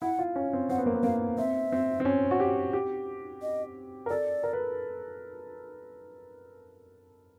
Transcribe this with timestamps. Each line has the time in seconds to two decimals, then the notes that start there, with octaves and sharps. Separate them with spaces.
0.02 E4 F#5
0.19 F4
0.36 C#4
0.53 C4
0.69 C4 F#5
0.78 B3
0.86 A#3
0.94 B3
1.03 A#3 F5
1.38 C4 E5
1.72 C4
2.00 C4
2.05 C#4
2.31 F#4
2.40 G4
2.73 G4
3.42 D#5
4.06 A#4
4.10 A4 D5
4.44 A#4
4.53 B4